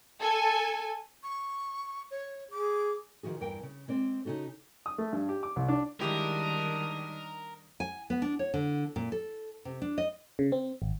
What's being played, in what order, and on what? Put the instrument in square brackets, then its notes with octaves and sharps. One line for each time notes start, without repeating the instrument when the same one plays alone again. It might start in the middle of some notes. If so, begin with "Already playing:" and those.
[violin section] A4 G#5
[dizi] C#6
C#5
[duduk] G#4 [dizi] D6
[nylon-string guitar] D#3 F3 F#4 G#4
E2 G2 A#4 G5
C#3
G#3 C4 D5
C#3 D#4 F#4 A4
[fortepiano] D#6
A3
G2
G4
D6
C2
D4
[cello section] D#3 G3 [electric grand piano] G#3 E4 G4 [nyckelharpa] D4 D#6 [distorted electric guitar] A#4
[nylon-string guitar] G#5
B3
D4
C#5
D3
A#2
A4
C3
D4
D#5
[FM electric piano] C#3
C4
G#1